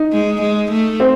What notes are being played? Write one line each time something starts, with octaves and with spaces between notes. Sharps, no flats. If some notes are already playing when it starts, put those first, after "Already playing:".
Already playing: D#4
G#3
G#3
A3
C4